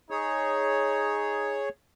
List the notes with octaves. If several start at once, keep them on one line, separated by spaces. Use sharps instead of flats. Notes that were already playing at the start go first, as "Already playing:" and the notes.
D#4 G#4 C#5